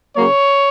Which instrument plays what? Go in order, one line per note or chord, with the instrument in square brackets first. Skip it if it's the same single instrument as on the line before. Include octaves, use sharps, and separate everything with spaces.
[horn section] C#3 F#3 A#3 C#5